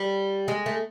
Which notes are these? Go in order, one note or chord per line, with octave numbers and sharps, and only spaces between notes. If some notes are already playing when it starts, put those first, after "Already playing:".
Already playing: G3
G#3
A3